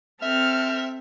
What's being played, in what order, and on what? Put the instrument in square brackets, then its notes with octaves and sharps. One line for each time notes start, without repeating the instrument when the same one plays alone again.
[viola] C4 A4 [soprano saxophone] E5 [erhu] F6